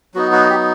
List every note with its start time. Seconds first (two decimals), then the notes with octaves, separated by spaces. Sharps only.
0.14 F#3 B3 D#4 F#4
0.32 F#4
0.50 G4